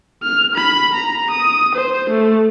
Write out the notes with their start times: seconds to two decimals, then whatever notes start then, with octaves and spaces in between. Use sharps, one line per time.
0.23 F6
0.56 B5
0.95 A#5
1.31 D#6
1.75 C5
2.10 A3